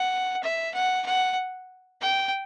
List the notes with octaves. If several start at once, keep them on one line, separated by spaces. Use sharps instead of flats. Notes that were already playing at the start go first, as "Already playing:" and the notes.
Already playing: F#5
E5
F#5
F#5
G5